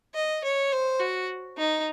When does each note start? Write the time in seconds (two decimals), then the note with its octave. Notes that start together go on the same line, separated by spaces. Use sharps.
0.15 D#5
0.44 C#5
0.72 C5
1.00 F#4
1.58 D#4